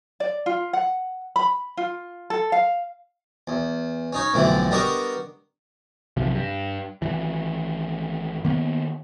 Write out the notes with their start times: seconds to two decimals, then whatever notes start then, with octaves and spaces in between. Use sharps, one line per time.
0.20 D5
0.46 F4
0.73 F#5
1.36 B5
1.77 F4
2.30 A4
2.52 F5
3.47 E2
4.13 C#4 D#4 C#5
4.34 B1 F2 A2 D3 E3 A3
4.71 G3 B3 D4 A#4 D#5 C#6
6.17 B1 C3 F3
6.35 G2
7.02 G#1 E3
8.45 D#3 A#3 B3